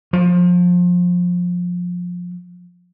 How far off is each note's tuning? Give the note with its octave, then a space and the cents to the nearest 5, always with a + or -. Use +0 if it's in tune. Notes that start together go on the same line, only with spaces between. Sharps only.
F3 +25